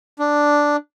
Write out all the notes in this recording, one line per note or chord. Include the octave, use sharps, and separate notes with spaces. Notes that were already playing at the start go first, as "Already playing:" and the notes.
D4